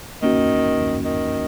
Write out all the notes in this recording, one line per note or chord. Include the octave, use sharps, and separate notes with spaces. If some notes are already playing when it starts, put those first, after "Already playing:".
D#3 A#3 C#4 F#4
D#3